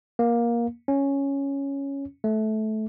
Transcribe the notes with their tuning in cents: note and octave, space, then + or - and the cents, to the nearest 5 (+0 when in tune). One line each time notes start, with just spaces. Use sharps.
A#3 +15
C#4 +0
A3 -20